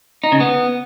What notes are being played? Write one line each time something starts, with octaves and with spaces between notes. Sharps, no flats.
D#4
C#3
B3